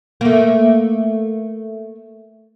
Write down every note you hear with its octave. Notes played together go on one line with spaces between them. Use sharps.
A3 A#3